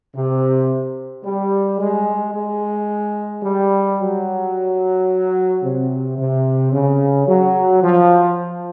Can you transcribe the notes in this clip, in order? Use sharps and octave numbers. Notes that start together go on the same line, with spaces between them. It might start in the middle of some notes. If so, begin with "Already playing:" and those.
C3
G3
G#3
G#3
G3
F#3
C3
C3
C#3
F#3
F3